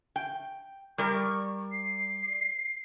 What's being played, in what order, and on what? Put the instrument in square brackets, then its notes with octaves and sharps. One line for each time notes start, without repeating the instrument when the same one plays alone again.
[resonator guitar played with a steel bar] G5
[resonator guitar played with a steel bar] G3 A#4 D5 [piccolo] C#6
[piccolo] C7